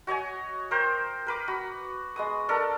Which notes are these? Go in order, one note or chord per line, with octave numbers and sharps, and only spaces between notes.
F#4 C#5 D#5 G#5
A#4 C5 G5
A#4 B4 D6
F#4 B5
G#3 B3 D#6
D4 A4 A#4